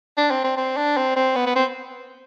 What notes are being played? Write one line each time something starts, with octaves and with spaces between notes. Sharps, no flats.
D4
C4
C4
C4
D4
C4
C4
B3
B3
C4